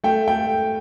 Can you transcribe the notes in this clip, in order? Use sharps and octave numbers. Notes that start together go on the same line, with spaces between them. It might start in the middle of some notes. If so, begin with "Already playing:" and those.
A3 G5
A3 G5